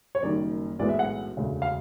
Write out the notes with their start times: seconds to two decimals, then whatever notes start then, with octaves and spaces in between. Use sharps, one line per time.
0.15 C#5
0.22 F#1 F#2 D#3 G3 D5
0.79 B1 A2 E3 G#3 B3 D5
0.89 E5
0.99 F#5
1.37 E1 D2 C#3
1.62 F5